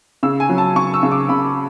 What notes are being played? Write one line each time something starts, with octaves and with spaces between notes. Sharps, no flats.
C#3 E6
G#5
F#3
A5
C#3 C#6
E6
C#3
D6
C#3 B5